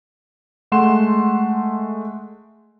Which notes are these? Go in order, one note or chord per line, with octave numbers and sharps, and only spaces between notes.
G#3 A3 F#5 C6 E7